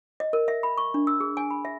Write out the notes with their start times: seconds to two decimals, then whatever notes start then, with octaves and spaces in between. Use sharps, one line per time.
0.20 D#5
0.33 A#4
0.48 E5
0.63 B5
0.78 C#6
0.94 D4
1.07 E6
1.20 G#4
1.37 G#5
1.50 B5
1.65 E5